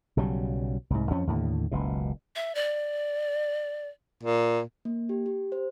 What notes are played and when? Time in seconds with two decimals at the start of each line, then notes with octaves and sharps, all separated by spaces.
0.17 B1 C#3 F#3 G3
0.90 C2 G#2
1.11 F2 F3 C#4
1.27 D#2 A2 D3
1.71 F#1 C#2 B2
2.36 E5
2.55 D5
4.23 A#2
4.85 A#3
5.09 G4
5.26 G4
5.52 C5